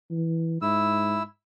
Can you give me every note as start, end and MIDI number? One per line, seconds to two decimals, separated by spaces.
0.11 0.58 52
0.62 1.22 44
0.62 1.23 64
0.62 1.23 88